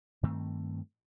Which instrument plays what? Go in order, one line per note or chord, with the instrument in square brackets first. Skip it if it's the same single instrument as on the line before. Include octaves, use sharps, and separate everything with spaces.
[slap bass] G2 D#3 A3 C4